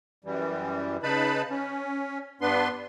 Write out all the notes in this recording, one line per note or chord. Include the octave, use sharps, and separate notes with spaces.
F#2 E3 G3
C#3 D#4 B4 A5 B5
C#4
G2 B3 D4 B4 C6